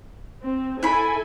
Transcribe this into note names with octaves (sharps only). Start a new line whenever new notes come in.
C4
E4 A4 G#5 B5